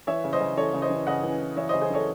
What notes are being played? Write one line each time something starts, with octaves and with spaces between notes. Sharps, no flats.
E3 C#5 E5
C#3
C5 D#5
C#3
E3 A4 C#5
C#3
C5 D#5
E3
C#3 D#5 F#5
E3
E3
E3 C#5 E5
C#3 C5 D#5
G#4 C5
E3 A4 C#5